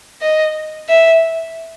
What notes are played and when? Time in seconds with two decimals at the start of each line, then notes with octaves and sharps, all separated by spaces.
0.22 D#5
0.89 E5